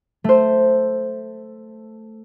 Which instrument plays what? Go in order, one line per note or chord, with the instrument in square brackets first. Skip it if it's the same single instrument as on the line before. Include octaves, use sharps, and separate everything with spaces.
[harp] A3 C5